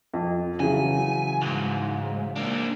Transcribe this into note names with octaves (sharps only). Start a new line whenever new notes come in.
F2
C#3 E3 F#3 G#5
C2 G#2
A#3 D4